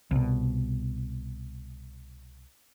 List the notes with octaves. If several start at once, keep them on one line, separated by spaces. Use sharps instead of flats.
C2 B2